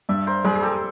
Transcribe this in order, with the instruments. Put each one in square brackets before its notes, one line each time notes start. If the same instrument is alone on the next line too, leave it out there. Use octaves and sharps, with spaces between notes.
[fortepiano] G2 [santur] D5 E5
[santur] A#4 C5
[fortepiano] G3 [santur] G#4 A#4
[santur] G#4
G4 A4